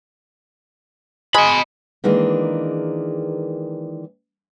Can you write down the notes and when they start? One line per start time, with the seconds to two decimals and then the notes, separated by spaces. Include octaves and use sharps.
1.34 G#3 D#5 B5
2.04 D#3 E3 G#3 A#3 D4 G#4